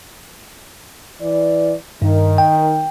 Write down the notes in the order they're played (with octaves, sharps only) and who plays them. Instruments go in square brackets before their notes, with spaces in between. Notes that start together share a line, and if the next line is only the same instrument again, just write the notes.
[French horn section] E3 D5
[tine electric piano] G2 [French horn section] D#3
[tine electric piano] G5